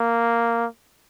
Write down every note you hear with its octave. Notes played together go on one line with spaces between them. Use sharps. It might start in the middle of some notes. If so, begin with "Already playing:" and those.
Already playing: A#3